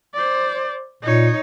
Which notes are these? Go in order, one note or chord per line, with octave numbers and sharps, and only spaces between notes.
C5 D5
A#2 D#4 C#5